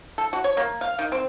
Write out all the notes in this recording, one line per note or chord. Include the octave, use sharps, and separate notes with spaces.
A4
F#4
C#5
A#3
F5
D#3
C4